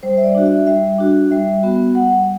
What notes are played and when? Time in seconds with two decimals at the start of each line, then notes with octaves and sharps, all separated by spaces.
0.03 G3 C5
0.17 E5
0.23 D5
0.35 D4 F#4
0.46 E5
0.67 G3 E5
0.98 D4 F#4
1.31 G3 E5
1.63 B3 F#4
1.95 G3 F#5